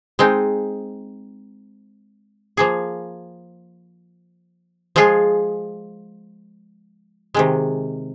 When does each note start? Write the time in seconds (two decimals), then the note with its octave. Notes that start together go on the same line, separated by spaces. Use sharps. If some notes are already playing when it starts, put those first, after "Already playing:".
0.19 G#3 C4 D#4
2.57 F3 A#3 G#4
4.96 F3 G#3 F4 G#4
7.34 C3 D#3 G#3